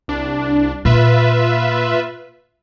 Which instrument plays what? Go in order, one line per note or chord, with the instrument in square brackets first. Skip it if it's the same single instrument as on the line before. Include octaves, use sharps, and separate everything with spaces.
[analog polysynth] C2 D4
[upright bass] A#2 [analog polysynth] F4 B4 E5